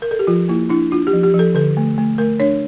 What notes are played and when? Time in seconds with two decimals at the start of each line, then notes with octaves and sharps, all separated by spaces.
0.02 A#4
0.11 A4
0.19 G4
0.27 F3 F4
0.49 A#3 E4
0.69 D4 E4
0.91 D4 F4
1.07 G4
1.13 F3
1.23 G4
1.34 F3
1.39 A4
1.55 D3 A4
1.77 A3
1.98 A3
2.18 A3 A#4
2.40 D4 C#5